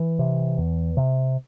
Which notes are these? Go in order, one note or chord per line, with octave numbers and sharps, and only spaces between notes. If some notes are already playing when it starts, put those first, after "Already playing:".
Already playing: E3
C3
E2
C3